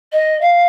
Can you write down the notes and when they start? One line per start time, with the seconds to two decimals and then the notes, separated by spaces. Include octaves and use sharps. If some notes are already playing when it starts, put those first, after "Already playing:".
0.12 D#5
0.41 F5